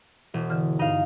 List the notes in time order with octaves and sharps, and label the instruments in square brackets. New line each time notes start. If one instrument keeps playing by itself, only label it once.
[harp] E1
[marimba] D3 E3 F6
[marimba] G2 [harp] D#4 F5